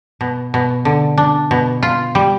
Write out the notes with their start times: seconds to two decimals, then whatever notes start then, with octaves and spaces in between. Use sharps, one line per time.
0.21 B2
0.54 B2
0.85 D3
1.18 D4
1.51 B2
1.83 F4
2.15 G3